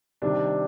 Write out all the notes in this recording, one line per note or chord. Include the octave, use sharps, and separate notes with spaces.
C3 D#3 G3 D4